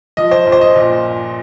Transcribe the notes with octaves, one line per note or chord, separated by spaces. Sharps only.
F3 D#5
C5
A#1
C5
D#5
A#2